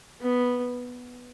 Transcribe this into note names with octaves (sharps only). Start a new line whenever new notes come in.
B3